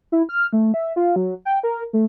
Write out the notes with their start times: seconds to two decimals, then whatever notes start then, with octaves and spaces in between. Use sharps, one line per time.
0.12 E4
0.29 F6
0.53 A3
0.74 E5
0.96 F4
1.16 F#3
1.45 G5
1.63 A#4
1.93 A3